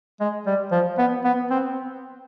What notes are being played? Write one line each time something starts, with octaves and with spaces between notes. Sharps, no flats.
G#3
G3
F3
B3
B3
C4